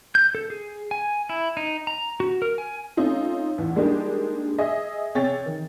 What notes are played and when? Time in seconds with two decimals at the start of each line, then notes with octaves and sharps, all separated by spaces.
0.15 G6
0.35 A4
0.50 G#4
0.91 G#5
1.29 E4
1.57 D#4
1.87 A#5
2.20 F#4
2.42 A#4
2.58 G#5
2.97 A3 C4 C#4 D#4 F4
3.58 A1 E2
3.76 G3 G#3 A#3 D4 D#4 G4
4.58 G#4 D#5 E5
5.15 C3 G#4 C#5 G5 A6
5.46 D#3